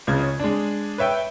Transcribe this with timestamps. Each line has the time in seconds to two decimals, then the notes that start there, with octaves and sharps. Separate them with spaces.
0.07 C#2 C#3 G#6
0.23 C#5
0.40 G#3 D4
0.98 B4 C#5 E5 G5